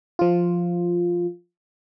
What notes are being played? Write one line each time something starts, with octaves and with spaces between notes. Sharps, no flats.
F3 F4